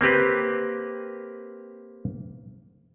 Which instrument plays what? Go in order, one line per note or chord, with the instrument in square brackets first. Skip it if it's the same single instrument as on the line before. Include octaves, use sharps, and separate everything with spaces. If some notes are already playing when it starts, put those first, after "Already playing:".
[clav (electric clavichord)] A#3 C4 G4 B4